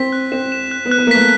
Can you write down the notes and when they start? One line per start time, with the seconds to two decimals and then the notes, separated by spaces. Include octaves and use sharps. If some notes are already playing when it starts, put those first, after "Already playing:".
Already playing: C4 B6
0.12 F#6
0.32 C4 E7
0.52 E7
0.71 F#6
0.85 B3
0.91 F#6
0.98 B3
1.07 A#3
1.11 A3 B6